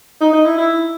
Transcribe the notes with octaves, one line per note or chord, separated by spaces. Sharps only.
D#4
D#4
E4
E4